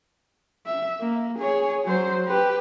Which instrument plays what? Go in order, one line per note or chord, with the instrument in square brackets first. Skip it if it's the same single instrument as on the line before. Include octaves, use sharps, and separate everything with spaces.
[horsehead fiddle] E5
A#3
G#4 C#5
F#3 C5
G4 B4